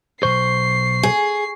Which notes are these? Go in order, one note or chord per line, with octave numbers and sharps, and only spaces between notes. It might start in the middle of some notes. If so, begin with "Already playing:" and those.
B1 A#2 C5 C#6 C7
G#4